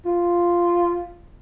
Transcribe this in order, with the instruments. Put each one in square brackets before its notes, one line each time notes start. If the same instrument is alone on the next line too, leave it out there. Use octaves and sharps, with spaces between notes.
[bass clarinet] F4